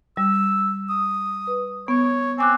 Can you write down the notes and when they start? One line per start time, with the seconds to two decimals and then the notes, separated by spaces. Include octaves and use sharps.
0.17 G3 E6
0.89 D#6
1.47 B4
1.88 B3 C#5
2.38 C4 G#5 D6 F#6